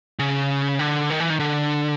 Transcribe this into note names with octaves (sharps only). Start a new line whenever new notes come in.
C#3
D3
D#3
E3
D#3
D3